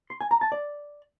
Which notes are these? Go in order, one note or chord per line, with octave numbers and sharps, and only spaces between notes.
C6
G#5
A#5
A5
D5